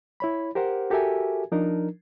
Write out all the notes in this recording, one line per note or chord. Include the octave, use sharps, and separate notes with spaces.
E4 C#5 B5
G4 A#4 C5 F#5
F#4 G4 A4 A#4 E5 G#5
F3 D4 D#4 A#4